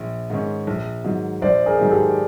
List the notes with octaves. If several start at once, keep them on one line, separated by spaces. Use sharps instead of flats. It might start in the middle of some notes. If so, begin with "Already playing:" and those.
Already playing: A#1
G#2 D#3 G#3 C#4
A#1
G#2 D#3 F#3
A#1 C5 D5
G#4 A#4
G#2 D#3 F#3
G4 A4